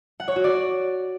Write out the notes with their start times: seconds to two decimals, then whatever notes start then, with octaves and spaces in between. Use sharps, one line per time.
0.20 F#5
0.28 C#5
0.36 F#4
0.44 D5